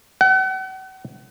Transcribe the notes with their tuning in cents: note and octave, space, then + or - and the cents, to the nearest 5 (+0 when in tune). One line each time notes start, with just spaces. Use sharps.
F#5 +40